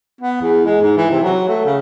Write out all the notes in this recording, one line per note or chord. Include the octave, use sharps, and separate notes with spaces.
B3
E2
G#3
G#2
E3
C3
F#3
A3
C#3